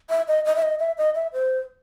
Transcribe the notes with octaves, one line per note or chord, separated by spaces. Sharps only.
E5
D#5
D#5
E5
D#5
E5
D#5
E5
C5